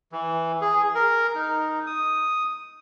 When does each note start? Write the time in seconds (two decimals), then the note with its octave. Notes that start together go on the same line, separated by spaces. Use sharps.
0.12 E3
0.61 G#4
0.95 A#4
1.35 D#4
1.87 D#6